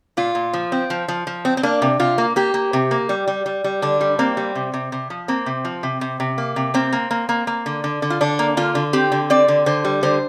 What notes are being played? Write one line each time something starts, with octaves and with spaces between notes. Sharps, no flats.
A#2 F4
A#2
F3
C4
F3
F3
F3
C4
C4
A#3 D4
C3
C3 F4
A#3
A#3 G4
A#3
C3
A#3
G3
G3
G3
G3
D3 D4
G3
A#3 C4
G3
C3
C3
C3
F3
A#3 C4
C3
F3
C3
C3
C3
A#3
C3
A#3 C4
A#3
A#3
A#3
A#3
D3
D3
D3
F4
D3 D4
A#3
D3 F4
D3
C4 G4
D3
C4 D5
D3
D3 C5
G3
D3 C5